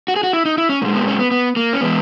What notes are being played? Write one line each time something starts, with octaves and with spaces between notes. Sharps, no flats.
F#4
G#4
F#4
E4
D#4
E4
C#4
A#2 G#3 A#3
B3
C#4
B3
B3
A#3
C#4
E3 G#3 B3